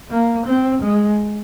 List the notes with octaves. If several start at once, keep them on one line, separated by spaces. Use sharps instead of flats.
A#3
C4
G#3